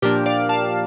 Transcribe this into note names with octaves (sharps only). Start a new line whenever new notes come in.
A#2 F3 A#3 D4 G4 A#4
D5 F5
F5 A5